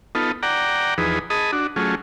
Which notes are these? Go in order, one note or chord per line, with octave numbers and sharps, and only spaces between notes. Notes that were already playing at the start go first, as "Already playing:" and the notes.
B3 D#4 F4 A4
D5 F#5 G5 A#5
E2 F3 D#4 G#4 B4
G#4 D#5 A5 B5 D#6
D4 F#4
F#3 A3 C#4 F4 G#4